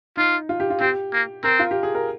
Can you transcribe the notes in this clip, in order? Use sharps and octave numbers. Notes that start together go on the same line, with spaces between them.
D#4 F4
F4
G4
F4
C4 G4
A#3
C4 A#4
F4
G4
G#4
A#4